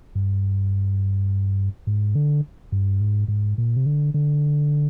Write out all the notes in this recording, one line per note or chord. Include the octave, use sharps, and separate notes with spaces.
G2
G#2
D3
G2
G#2
G#2
A#2
C3
D3
D3